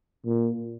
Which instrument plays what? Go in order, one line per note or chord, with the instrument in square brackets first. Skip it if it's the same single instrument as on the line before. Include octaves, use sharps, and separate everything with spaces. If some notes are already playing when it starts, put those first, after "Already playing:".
[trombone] A#2